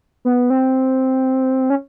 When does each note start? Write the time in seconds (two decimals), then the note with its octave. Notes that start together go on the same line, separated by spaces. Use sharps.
0.25 B3
0.50 C4
1.70 C#4